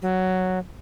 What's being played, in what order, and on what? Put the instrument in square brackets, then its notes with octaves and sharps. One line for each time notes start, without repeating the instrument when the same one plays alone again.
[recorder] F#3